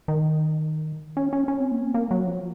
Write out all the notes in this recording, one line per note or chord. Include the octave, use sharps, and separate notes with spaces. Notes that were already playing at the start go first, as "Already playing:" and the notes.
D#3
C#4
C#4
C#4
C4
A#3
C4
A#3
F#3
F3